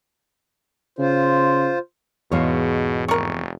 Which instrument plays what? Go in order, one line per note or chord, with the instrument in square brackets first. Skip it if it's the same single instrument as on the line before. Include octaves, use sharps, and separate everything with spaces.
[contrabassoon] C#3 [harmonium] F4 C5
[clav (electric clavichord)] E2 F5 [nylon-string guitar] G#2 G#3 C#5 [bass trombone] B2
[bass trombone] F1 [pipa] A#4 C#6